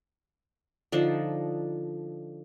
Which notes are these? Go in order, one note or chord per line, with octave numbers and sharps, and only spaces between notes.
D3 F3 D4 D#4